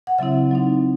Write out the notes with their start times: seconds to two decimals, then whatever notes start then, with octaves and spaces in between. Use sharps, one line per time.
0.07 F#5
0.19 C#3 F#3 C4 E4 E5
0.51 F#3 C4 D#4